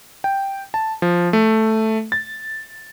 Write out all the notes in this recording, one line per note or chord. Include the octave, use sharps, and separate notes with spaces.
G5
A5
F3
A3
A6